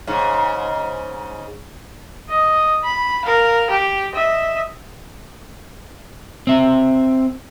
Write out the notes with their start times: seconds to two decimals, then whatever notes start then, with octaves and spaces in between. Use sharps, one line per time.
0.07 G#2 C#3
2.29 D#5
2.84 B5
3.25 A#4 F5
3.70 G4
4.11 D#5 E5
6.47 C4 E5